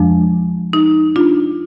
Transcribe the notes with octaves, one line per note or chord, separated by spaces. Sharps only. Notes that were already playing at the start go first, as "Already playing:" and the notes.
Already playing: F2 F3 G#3 D4
D#4
D4 F4